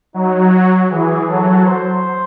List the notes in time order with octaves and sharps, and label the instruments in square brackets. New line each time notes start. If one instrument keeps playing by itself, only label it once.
[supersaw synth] F#3 [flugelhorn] D#4
[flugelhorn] F#4
[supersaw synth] E3 [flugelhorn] G#4
[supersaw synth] F#3 [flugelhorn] A4
[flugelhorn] C5